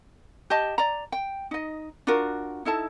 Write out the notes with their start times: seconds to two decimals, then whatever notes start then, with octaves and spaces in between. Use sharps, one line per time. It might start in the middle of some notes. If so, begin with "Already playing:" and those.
0.50 G4 D#5 A5
0.78 D5 A#5
1.12 G5
1.51 D#4 D#5
2.07 D4 F4 F#4 A#4
2.65 D#4 E4 A4 A5